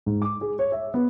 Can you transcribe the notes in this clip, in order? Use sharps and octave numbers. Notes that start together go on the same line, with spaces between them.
G#2
D6
G#4
C#5
E5
B3